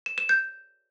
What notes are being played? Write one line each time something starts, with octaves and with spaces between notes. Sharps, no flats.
E7
E7
G6